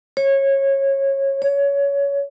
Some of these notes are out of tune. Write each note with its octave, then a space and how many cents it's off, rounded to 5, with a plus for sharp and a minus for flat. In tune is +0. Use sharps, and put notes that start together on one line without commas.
C#5 -20
C#5 +20